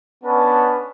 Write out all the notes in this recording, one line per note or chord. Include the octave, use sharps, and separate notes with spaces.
B3 C#4 D4 B4 A5